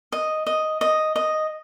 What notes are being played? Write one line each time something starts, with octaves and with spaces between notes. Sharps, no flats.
D#5
D#5
D#5
D#5